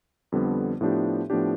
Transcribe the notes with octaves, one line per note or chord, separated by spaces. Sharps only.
F2 D3 G3 B3
A2 F3 B3 D4 G4
A2 F3 B3 D4 G4